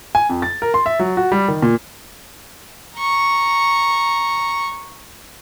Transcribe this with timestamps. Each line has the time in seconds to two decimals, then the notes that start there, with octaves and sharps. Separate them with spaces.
0.15 G#5
0.29 F2
0.42 A6
0.62 A#4
0.74 C6
0.86 E5
0.99 F#3
1.17 F#4
1.32 G3
1.48 D#3
1.62 A#2
2.98 A#5 C#6